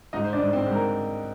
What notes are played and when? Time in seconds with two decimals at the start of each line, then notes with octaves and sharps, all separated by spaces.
0.13 G#2 D#4 D#5
0.24 C5
0.33 D4 D5
0.40 G#2
0.53 C4 C5
0.66 G#2
0.73 A#4